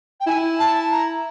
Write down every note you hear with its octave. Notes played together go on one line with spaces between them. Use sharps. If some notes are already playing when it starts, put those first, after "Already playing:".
G5
E4 G#5
A5
A#5